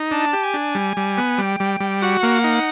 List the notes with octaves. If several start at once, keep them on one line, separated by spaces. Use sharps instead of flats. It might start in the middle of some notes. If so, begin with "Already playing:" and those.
Already playing: D#4
D4 A5
G4
G#5
D4
G3
G3
B3
G3 G5
G3
G3
F#4 F#5
A#3
D#4